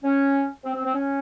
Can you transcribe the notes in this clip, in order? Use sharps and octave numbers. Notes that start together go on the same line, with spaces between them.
C#4
C4
C4
C4
C#4